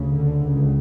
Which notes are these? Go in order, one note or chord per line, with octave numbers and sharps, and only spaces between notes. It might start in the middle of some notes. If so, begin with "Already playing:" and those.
Already playing: D2 C#3
D3
C#2 C#3